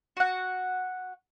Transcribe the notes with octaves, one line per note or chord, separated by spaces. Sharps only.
F#4 F#5